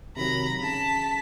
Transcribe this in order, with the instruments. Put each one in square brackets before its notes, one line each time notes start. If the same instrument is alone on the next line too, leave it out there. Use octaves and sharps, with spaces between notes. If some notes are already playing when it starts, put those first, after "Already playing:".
[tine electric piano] C3 D#3 F#3 [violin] A#5 B5
[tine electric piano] C#3 [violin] A5 B6